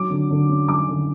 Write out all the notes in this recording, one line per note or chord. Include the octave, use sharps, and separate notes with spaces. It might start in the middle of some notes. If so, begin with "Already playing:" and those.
Already playing: F#3 D6
D3
D3
C#4
F#3 D6
D3